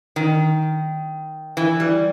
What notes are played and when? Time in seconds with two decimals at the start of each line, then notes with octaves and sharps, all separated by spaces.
0.16 D#3
1.57 E3
1.80 G3